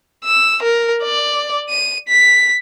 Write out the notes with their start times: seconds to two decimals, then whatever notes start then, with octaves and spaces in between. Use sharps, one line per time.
0.24 E6
0.62 A#4
1.03 D5
1.69 D#7
2.08 B6